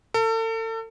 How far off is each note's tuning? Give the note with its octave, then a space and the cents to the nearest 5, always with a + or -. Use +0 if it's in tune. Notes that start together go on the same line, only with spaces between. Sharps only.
A4 +35